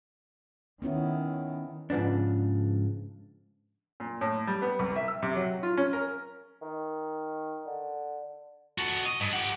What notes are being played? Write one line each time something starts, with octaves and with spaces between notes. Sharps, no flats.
D#3 B3 C#4 E4
G#2 C#3 F3 B3 D4
A#2
A2
G3
B3
C2
E5
E6
C3
F#3
F4
C#4
A#4
D#3
D3
F#4 A4
D#5
G2
G4 F#5